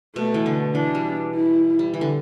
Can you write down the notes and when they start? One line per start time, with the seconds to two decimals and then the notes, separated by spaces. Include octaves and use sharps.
0.15 B2 A3
0.34 E3
0.46 D3
0.75 E3 D4
0.95 G3
1.35 E4
1.79 G3
1.94 E3
2.01 D3